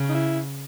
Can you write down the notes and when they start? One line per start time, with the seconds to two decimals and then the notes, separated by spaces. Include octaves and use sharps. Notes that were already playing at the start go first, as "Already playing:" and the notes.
Already playing: C#3
0.09 D#4
0.15 E4